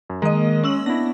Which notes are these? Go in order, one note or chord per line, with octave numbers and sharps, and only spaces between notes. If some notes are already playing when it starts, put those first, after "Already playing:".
F#2
D#3 G#3 A#3 D#5
C#4 E6 F#7
B3 D4 E4 A#6